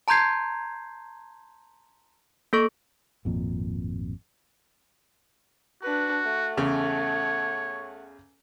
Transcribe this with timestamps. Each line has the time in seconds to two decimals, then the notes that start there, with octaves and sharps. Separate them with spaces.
0.08 A5 A#5 C6 G6 G#6 C7
2.53 A#3 A4 C#6
3.25 G#1 F2 A#2
5.83 D4 F#4 B4
6.25 A3 F#5
6.57 E2 C#3 C#5